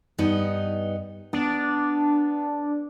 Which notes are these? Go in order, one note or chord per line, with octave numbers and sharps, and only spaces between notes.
G2 B3 D#4
B3 D4